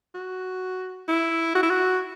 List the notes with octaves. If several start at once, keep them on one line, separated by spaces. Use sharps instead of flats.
F#4
E4
F#4
E4
F#4